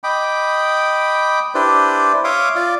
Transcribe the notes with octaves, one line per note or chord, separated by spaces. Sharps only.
D#5 G5 B5 D6
D4 E4 G4 B4 C5 D5
C#5 E5 F5 C6 D6 D#6
F4 D5 F5